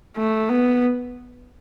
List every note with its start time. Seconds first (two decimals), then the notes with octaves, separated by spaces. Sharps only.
0.16 A3
0.49 B3